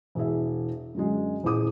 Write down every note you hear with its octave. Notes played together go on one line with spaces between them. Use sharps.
E1 E3 G#4 E5
F#2 D3 F#3 G#3
D#1 E2 A2 G#4 D6 D#6